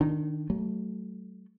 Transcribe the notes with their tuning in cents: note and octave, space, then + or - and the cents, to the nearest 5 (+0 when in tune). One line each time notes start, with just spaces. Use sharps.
D#3 -15 D4 +0
F#3 +40 A3 -5